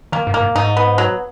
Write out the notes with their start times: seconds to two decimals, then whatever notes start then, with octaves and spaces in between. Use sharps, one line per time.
0.12 D#3 A#3
0.27 G#2
0.34 A#3
0.40 G#2
0.55 G#2 D#4
0.77 B3
0.98 F#3